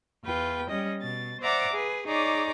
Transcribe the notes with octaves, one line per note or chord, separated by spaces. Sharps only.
E2 F4 B4 G5
G3 C#4 D#5
B2 A6
C5 D5 E5 F#5 A#5 D6
G#4 B4
D#4 G#4 C#5 D5 A#5 D6